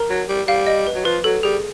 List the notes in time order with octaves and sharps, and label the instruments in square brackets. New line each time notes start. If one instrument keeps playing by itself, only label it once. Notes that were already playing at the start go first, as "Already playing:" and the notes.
Already playing: [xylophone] A#4 A#5
[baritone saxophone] F#3
G3
[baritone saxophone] G3 [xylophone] F5
[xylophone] D#5
B4
[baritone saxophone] F#3
[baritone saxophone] F3 [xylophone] B4
[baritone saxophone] F#3 [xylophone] A4
[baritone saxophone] G3 [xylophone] G#4